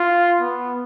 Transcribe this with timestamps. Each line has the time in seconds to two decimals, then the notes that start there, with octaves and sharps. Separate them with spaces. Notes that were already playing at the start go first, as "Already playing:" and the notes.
Already playing: F4
0.41 B3